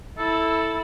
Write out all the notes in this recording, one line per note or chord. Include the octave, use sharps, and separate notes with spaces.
E4 A4